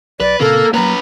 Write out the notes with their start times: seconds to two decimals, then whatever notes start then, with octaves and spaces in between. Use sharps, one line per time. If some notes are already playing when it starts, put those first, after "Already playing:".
0.20 B1 B4 D5
0.40 A#2 C#3 A#3 C4 A4
0.74 F#3 A#3 C#4 B4 A#5